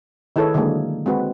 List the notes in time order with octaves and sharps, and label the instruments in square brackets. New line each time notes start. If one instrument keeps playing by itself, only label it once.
[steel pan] D#3 E4 G#4 A4 B4 C#5
D3 D#3 F#3 G#3 A#3 G#4
G#3 C4 F#4 B4